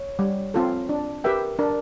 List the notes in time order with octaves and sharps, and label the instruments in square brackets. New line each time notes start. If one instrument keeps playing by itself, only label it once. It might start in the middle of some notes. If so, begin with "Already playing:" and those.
Already playing: [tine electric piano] C#5
[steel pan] G3
C4 F4 A4
D4
[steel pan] G4 B4 E5 G5 [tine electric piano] A#4
[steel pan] D4 [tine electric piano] A#4